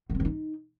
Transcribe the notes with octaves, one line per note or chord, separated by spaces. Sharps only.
D#3
C4
D#3
D#4